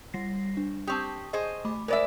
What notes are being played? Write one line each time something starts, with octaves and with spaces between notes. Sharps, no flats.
G3 A#6 C7
D4
C4 G4 A5 C#6 D#6
G#4 C5 D#5
A3 B5 D6
G#3 A#4 C5 D5 E5 B5